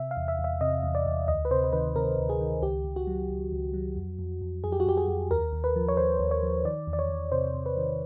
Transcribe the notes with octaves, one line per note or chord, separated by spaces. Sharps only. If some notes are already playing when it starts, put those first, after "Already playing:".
Already playing: C3 E5
F5
E2
E5
E2
E5
C3 D#5
E2
D5
E2
D2 D#5
B4
C3 C5
C5
D#3 B4
C3 A#4
D2
G#4
D#3
C#2 G4
C#2
F#4
F#3
C#2
C#2
F#3
F2
F2
F2
F2 G#4
G4
F#4
F2 G4
G#4
F2
D#2 A#4
D#2
B4
F3
C#5
D#2 C5
D#2
C#5
F3
D#3 D5
E2
D5
C#5
E2
C3 C5
C3
B4
D#3